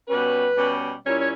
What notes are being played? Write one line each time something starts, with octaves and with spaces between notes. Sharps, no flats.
B2 G3 C#4 B4
B2 G3 C#4
A#2 G3 C#4 E4 C#5
C#5